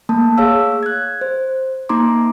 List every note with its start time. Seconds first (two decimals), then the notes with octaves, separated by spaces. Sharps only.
0.09 A3 A#3 A5
0.38 G#4 C#5 F5 E6
0.83 F#6 G#6
1.21 C5
1.89 A#3 D#4 A#5 C6 D6